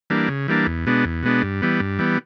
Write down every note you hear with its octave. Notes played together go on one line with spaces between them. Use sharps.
E3 G3 A#3 D4
C#3
E3 G3 A#3 D4
E2
B2 G#3 B3 D4
E2
B2 G#3 B3 D4
G2
E3 G3 B3
G2
E3 G3 B3